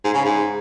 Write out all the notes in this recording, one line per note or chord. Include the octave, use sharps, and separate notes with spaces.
G#2
C#3
G#2